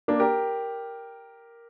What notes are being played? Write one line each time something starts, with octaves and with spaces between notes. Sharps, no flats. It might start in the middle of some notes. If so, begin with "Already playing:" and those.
A#3 D4
G4 A#4